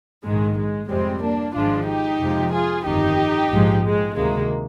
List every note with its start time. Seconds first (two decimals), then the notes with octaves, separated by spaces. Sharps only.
0.24 A#1 G#2 D#3 G#3
0.57 G#3
0.89 F2 C3 G3 G#3 C4
1.21 A#3 D4
1.54 G#1 G#2 F3 G#3 D4 F4
1.87 D#4 G4
2.19 F2 C3 F3 G#3
2.52 F4 G#4
2.85 G1 F2 D#3 D#4 G4
3.50 A#1 G#2 F3 G#3
3.83 G#3
4.15 D2 C3 D#3 G#3 A#3